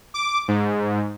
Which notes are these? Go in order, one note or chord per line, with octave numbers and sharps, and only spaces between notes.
D6
G#2